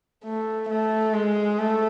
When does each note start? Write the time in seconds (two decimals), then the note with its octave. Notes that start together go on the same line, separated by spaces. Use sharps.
0.25 A3
0.69 A3
1.14 G#3
1.59 A3